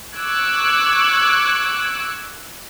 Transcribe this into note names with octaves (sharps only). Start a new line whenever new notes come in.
C#6 D6 E6 F#6 G#6